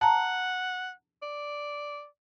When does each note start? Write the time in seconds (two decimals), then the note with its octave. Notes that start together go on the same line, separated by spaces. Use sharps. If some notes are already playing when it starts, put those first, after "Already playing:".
0.01 F#5 A5 A#5
1.22 D5